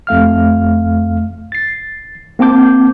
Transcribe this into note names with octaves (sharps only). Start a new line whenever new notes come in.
F2 A3 F5 F6
A6 C7
A#3 C4 A5 D6 G6